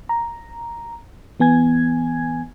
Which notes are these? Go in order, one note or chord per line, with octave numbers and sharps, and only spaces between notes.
A#5
E3 B3 G#5 G#6